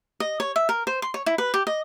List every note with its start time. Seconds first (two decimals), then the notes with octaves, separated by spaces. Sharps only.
0.20 D#5
0.40 C#5
0.56 E5
0.69 A#4
0.87 C5
1.02 C6
1.14 C#5
1.26 E4
1.38 B4
1.54 G4
1.67 D#5